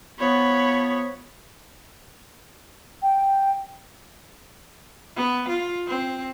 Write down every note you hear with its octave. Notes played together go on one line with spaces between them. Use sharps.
F3 B3 C#5 B5
G5
B3
F4
C4